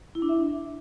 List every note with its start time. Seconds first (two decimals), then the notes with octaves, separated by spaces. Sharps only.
0.15 E4
0.22 D4
0.29 E5